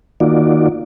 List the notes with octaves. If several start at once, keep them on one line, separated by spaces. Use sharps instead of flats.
D#3 A#3 D#4 F4 F#4 D5